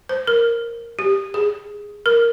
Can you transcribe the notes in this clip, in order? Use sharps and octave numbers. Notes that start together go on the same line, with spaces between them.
C5
A#4
G4
G#4
A#4